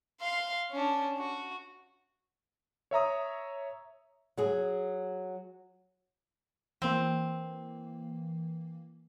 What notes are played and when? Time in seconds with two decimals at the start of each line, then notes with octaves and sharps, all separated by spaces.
0.21 F5 C6
0.71 C#4 D4
1.18 F#4
2.91 C#5 E5 A#5 D#6
4.37 F#3 G#4
6.82 E3 A#3 C4